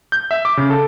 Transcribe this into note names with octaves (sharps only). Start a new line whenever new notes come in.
G6
E5
D6
C#3
A4